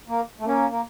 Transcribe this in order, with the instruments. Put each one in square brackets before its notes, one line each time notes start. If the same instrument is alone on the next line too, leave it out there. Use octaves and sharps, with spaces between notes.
[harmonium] A#3
A3
[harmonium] A#3 [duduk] C#4
[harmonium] A#3